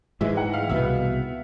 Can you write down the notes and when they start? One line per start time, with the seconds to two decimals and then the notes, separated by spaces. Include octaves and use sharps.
0.21 G#2 E3 G#3 E5
0.37 F#5
0.53 F5
0.69 C2 B2 G3 B3 E5